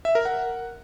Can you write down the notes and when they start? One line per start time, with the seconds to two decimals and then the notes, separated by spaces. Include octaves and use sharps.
0.05 E5
0.15 A#4
0.25 F#5